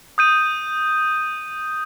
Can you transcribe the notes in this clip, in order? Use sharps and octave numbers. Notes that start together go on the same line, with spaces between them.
D#6 G6 D#7